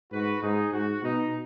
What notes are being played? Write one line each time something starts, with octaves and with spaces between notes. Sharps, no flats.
G#2 F#4 B4
G#2 D#4 G#4
G#2 F#4
B2 D#4